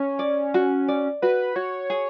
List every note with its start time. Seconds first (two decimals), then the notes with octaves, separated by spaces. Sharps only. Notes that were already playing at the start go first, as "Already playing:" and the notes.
Already playing: C#4
0.19 D5
0.54 F#4
0.88 D5
1.22 F#4 B4
1.56 F#4 C#5
1.90 G#4